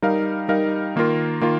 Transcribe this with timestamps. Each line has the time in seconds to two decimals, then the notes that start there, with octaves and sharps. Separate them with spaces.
0.02 G3 D#4 A#4 F5
0.48 G3 D#4 A#4 F5
0.96 D#3 A#3 F4 A#4
1.41 D#3 A#3 F4 A#4